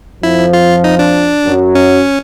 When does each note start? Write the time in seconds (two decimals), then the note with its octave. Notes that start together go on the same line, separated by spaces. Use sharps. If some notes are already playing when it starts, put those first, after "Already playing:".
0.23 F2 F3 E4
0.53 F4
0.84 D#4
0.99 D4
1.45 F#2 F#3
1.75 C#4